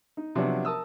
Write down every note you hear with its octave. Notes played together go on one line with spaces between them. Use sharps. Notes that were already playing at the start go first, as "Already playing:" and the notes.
D#4
C3 F3 F#3 B3 D4 F#4
A#4 A5 D#6 E6